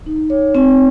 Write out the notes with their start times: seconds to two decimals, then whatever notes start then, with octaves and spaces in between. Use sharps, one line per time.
0.06 D#4
0.30 C#5
0.55 C4